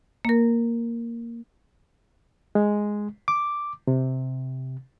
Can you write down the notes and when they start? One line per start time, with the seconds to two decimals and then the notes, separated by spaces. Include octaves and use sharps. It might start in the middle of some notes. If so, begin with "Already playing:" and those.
0.25 A#3 A#4
2.55 G#3
3.28 D6
3.87 C3